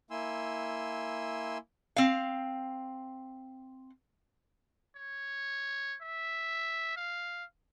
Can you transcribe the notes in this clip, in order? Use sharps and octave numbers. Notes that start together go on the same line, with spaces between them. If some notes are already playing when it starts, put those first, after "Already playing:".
A#3 E4 G#5 C6 E6
C4 F5
C#5
E5
F5